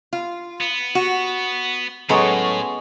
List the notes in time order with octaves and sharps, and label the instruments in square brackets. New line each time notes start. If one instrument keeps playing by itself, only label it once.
[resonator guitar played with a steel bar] F4
[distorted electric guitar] B3
[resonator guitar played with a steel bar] F#4
[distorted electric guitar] A2 [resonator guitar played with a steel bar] F#3 A4 C#5 [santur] G#3 B3 C#4